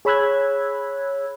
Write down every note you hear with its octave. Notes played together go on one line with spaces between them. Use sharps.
G#4 C#5 B5 E6 F#6 G#6